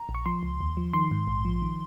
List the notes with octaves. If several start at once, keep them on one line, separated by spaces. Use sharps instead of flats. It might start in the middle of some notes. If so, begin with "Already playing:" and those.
Already playing: A#5
A#1
C#6
F3 C6
C#2
D#2
F3
D#3 C6
G#2
A#1
F3
D#3